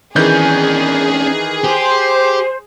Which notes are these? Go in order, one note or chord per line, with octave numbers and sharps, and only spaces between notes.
D#3 E3 C#4 D4 G#4 G6
G4 C5